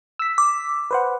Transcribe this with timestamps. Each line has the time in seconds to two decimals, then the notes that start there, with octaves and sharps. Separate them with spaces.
0.19 E6 B6
0.38 D6
0.91 B4 C5 F#5